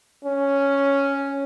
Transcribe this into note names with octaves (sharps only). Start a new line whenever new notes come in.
C#4